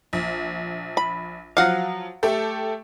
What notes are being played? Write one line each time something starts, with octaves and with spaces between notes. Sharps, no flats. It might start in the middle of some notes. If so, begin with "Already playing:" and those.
A#1
B5
F3 F#3 F5 F#5
A3 G4 A4